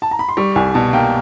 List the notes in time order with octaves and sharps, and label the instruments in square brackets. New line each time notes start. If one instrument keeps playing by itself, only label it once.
[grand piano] A5
A#5
B5
C6
[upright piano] G3 [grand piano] C#6
[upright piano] C2 [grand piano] G#5
[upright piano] B2 [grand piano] A5
[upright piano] A#3 [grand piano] G5